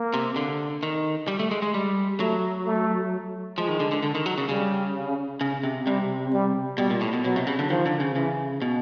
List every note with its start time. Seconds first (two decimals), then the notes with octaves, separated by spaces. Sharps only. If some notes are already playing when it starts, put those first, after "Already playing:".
Already playing: A#3
0.14 C3
0.36 D3
0.83 D#3
1.28 G3
1.39 A3
1.51 G#3
1.62 G#3
1.74 G3
2.20 F#3 A3
2.66 A3
3.58 F3 G#3
3.69 D#3
3.80 D3
3.92 D3
4.03 D3
4.15 D#3
4.26 F#3
4.38 C#3
4.49 C#3 G3
5.41 C#3
5.63 C3
5.86 C3 G3
6.32 G3
6.78 B2 G3
6.90 A#2
7.01 A2
7.13 B2
7.24 B2 F#3
7.36 C3
7.47 C#3
7.59 D3
7.70 D#3 F3
7.86 D3
8.00 C#3
8.16 C#3 E3
8.62 B2